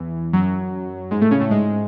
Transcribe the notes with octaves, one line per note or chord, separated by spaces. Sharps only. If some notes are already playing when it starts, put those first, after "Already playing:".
Already playing: E2 E3
F#2 F#3
G#2 G#3
A2 A3
C#3 C#4
A2 A3
G#2 G#3